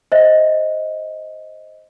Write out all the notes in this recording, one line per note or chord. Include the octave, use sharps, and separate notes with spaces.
C5 D#5 E5